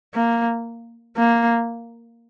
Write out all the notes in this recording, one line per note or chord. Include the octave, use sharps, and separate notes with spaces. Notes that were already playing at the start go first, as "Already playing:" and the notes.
A#3
A#3